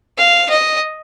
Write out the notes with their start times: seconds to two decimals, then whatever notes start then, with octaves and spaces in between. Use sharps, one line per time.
0.18 F5
0.50 D#5